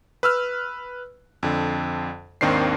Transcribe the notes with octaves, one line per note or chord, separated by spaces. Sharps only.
B4 E6 F6
F2 D3
G#1 D#2 D#3 C4 D4 C7